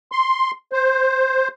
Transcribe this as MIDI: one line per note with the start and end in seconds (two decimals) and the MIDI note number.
0.12 0.51 84
0.73 1.48 72